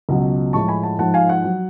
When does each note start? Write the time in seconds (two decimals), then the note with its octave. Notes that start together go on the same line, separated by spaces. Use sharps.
0.09 C#2 B2 F#3
0.53 A2 F3 G#3 A5 C#6
0.68 G#5 B5
0.83 F#5 A5
0.99 G#2 F3 G#3 F#5 A5
1.14 F5 G#5
1.29 F#5
1.45 F#3